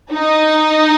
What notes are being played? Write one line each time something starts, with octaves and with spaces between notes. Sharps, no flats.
D#4